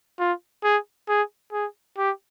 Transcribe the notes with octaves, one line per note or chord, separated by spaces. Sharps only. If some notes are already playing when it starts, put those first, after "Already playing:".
F4
G#4
G#4
G#4
G4